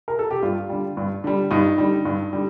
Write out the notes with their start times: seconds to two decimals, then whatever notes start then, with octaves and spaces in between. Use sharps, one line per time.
0.08 A#4
0.19 A4
0.31 G4
0.42 G2 F4
0.70 D3 G3
0.97 G2
1.24 D3 G3
1.51 G2 D#4
1.78 D3 G3
2.05 G2
2.33 D3 G3